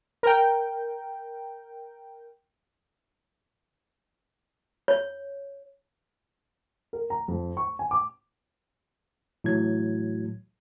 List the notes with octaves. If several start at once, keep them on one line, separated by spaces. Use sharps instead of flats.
A#4 G5
C#5
A#4
A#5
F2
C#6
G#5
D6
A2 E3 F#3 G#6